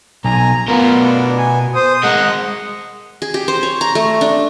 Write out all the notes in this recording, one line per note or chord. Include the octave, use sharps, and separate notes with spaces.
B1 G#5 A#5
B2 B3 F4 A#4
D4
G#5
C5 D#6
G#3 A#4 D#5 F#5
G#4
G4
C5
C#5
A#5
A3
D4